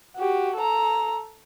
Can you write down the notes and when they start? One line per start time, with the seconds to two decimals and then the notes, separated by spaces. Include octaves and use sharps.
0.17 F#4 G4
0.57 A4 A#5